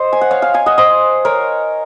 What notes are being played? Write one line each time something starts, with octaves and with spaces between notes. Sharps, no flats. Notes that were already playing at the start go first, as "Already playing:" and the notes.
Already playing: C5 D#5
G#5
F#5
C#5 F5
F5 G#5
F5 G#5
D#5 F#5
C5 D#5
A#4 C#5